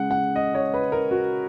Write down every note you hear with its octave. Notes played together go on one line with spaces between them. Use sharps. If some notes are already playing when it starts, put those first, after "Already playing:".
Already playing: C#3 G#3 F#5
F#5
D#5
C#5
B4
A#4
F#4